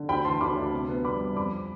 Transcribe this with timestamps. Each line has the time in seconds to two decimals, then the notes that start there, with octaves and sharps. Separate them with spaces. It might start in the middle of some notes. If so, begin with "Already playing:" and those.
Already playing: D3
0.09 D2 G5 B5
0.25 E3 A5 C6
0.41 D2 B5 D6
0.56 D2
0.73 C3
0.89 B3
1.04 G3 B5 D6
1.21 G3
1.36 F2 B5 D6